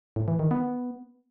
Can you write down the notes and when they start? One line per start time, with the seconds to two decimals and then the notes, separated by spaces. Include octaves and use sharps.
0.16 A2
0.28 E3
0.39 D#3
0.51 B3